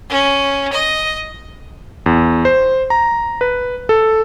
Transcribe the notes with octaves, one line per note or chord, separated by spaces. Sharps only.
C#4
D#5
E2
C5
A#5
B4
A4